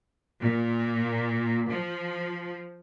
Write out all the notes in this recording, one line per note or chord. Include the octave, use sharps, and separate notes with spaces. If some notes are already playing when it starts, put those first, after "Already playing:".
A#2
F3